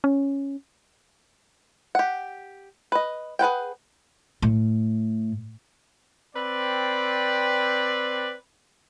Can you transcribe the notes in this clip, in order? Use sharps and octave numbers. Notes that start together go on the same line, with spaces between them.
C#4
G4 F#5
B4 D#5
G#4 B4 F#5 G5
A2
C4 B4 D5